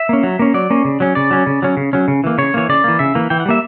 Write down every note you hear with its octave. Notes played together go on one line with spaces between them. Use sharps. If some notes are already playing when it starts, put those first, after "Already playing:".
Already playing: E5
A#3 C#4
F#3
A#3 C#4
F#3 D5
A#3 C#4
C#3
F#3 C#4
C#3 D5
F#3 C#4
C#3
F#3 C#4
C#3
F#3 C#4
C#3
E3 A#3
C#3 C#5
E3 A#3 C#5
C#3 D5
E3 A#3
C#3 E5
E3 A#3
E3 G5
F#5
G3 A#3 E5